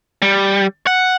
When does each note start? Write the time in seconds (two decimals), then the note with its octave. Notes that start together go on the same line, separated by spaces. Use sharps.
0.22 G3
0.87 F#5